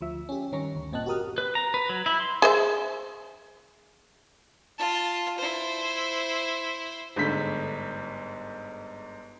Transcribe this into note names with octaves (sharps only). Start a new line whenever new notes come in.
D2 F3 E5
C#4 G4
G2 D#3 C#4 A#5 C#6
D2
G1 A#2 C4 D#5 A5 F#6
F#4 G4 A#4 D#6 F6
B4
A#5
B4
F#3
E4
C6
G#4 C5 E5
F4 A5
E4 C5
G1 G#2 D3 A3 B6